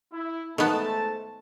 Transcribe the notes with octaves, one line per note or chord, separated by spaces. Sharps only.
E4
G#2 D#3 A3 B3 A5